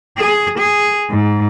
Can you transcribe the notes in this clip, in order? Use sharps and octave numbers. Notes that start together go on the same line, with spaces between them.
G#4
G#4
G#2